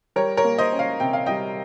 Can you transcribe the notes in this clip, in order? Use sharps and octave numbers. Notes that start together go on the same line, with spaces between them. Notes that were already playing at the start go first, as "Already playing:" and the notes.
G3 A#4 C#5
A#4 C#5
A#3
C5 D#5
C#4
C#5 F5
C3 G5
F5
G3 D#5 G5